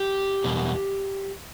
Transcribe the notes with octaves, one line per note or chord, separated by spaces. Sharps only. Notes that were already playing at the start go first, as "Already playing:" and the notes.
Already playing: G4
E2 B2 G3